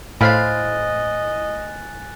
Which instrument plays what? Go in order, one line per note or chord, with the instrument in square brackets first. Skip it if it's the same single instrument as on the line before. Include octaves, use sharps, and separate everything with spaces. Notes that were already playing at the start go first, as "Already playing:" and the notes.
[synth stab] A2 [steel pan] C5 F5 B5 [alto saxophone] D#5 [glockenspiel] G#5 F#6 A6